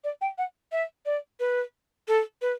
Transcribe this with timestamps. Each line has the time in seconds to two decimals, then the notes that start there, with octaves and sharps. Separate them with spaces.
0.04 D5
0.21 G5
0.38 F#5
0.72 E5
1.06 D5
1.40 B4
2.08 A4
2.42 B4